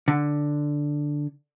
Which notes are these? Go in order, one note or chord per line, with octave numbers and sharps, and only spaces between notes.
D3